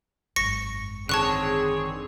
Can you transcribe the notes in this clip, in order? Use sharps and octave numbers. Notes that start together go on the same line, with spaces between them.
G#1 F#2 C#6 A#6 C#7
D3 D#3 C4 G#4 C#5 A5 C#6 F#6